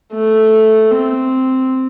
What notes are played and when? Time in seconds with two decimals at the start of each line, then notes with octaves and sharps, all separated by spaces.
0.13 A3
0.91 C4